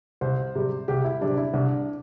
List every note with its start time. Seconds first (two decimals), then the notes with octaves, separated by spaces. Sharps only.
0.21 C2 C5
0.55 C3 G3
0.88 C2 G4
1.04 E4
1.21 C3 G3 D4
1.37 E4
1.53 C2 D4